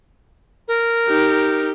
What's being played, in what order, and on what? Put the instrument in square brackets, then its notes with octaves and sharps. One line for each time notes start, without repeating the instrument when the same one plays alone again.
[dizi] A#4
[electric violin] D#4 G4